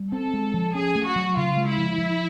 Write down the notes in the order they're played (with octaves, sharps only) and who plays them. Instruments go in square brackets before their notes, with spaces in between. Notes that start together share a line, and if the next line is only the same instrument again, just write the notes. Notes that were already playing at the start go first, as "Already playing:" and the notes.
Already playing: [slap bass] G3
[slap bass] C4 [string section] A4
[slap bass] G#3
F3
[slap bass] C#4 [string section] G#4
[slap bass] A3
[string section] F#4
[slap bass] F#3
[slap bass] C#3 [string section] F4
[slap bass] G#3
[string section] E4
[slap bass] F3
F3